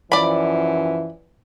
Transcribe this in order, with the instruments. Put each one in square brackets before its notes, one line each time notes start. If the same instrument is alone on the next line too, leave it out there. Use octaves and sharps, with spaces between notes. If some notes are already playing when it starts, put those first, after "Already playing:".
[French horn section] F#2 E3 F3 [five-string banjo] D5 B5